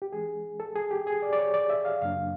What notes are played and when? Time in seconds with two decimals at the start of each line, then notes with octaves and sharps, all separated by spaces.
0.02 G4
0.12 E3 G#3 C#4 G#4
0.60 A4
0.75 G#4
0.91 G4
1.07 G#4
1.22 D5
1.33 D5
1.38 C#5
1.54 D5
1.70 E5
1.85 F5
2.01 F#2 C#3 F#3 A#3 D4 F5